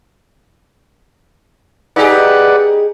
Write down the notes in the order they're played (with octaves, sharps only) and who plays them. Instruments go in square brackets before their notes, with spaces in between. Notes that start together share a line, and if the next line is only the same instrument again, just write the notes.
[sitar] D#4 G4 G#4 [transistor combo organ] B4 D5 F#5